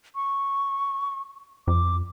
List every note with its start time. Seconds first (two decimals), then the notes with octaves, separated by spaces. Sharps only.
0.15 C#6
1.67 F2 D6